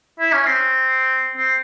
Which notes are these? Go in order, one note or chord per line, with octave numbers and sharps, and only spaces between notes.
E4
C#4
C4
C4